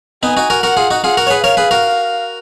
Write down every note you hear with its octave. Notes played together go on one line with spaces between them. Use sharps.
B3 D#4 G#5
D#4 F#4
F#4 A#4
F#4 A#4 F#5
F4 G#4
D#4 F#4
F4 G#4 F#5
F#4 A#4
C#5
G#4 B4
A#4 C#5 F5
G#4 B4
F#4 A#4